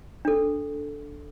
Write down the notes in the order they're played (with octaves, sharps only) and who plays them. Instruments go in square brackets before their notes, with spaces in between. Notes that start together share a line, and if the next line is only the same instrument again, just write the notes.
[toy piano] D4 A4